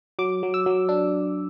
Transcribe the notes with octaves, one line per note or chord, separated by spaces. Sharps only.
F#3 D6
F#3
E6
F#3
D4